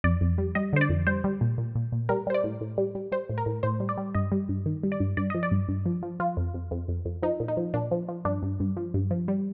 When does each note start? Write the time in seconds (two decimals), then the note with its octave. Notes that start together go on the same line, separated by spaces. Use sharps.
0.04 F2 D5
0.21 F2
0.38 G3
0.55 G3 D#5
0.73 D3 C5
0.81 D5
0.89 F2
1.07 G3 C5
1.24 G3
1.41 A#2
1.58 A#2
1.75 A#2
1.92 A#2
2.09 G3 A#4
2.27 G3 C5
2.34 D5
2.44 A2
2.61 A2
2.78 G3
2.95 G3
3.12 G3 C5
3.29 A2
3.38 A#4
3.46 A2
3.63 A2 C5
3.80 G3
3.89 D5
3.97 G3
4.14 G2 D#5
4.32 G3
4.49 G2
4.66 D#3
4.83 G3
4.92 D5
5.00 G2
5.17 G2 D5
5.30 F3 D#5
5.43 D5
5.51 G2
5.68 G2
5.86 F3
6.03 F3
6.20 F3 F4
6.37 F2
6.54 F2
6.71 F2
6.88 F2
7.05 F2
7.23 F3 D#4
7.40 A#2
7.48 D#4
7.57 F3
7.74 A#2 D4
7.91 F3
8.08 F3
8.25 G2 D4
8.43 G2
8.60 G2
8.77 F3
8.94 G2
9.11 F3
9.28 G3